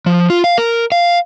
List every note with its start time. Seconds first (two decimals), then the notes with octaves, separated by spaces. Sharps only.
0.06 F3
0.30 F4
0.44 F5
0.58 A#4
0.92 F5